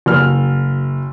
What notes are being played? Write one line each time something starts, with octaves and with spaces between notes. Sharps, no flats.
F#1 F6